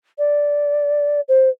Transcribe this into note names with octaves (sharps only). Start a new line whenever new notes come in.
D5
C5